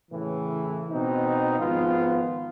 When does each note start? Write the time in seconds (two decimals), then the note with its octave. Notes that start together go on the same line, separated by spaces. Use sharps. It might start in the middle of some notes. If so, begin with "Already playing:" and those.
0.11 A2 C#3 E3
0.91 B2 C4 D#4
1.58 G#1 F3 B3 F4